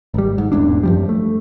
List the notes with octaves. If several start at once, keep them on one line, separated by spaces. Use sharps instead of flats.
G#1 G3
G#2
E1 A1 E2 D4
F#2 F3 G3
A3